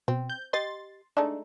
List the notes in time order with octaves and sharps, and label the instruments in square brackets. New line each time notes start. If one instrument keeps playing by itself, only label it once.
[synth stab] B2 [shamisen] C4
[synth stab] G6
[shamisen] G4 D#5 [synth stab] C6 A6
[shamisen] G#3 A3 D#4 [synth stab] D4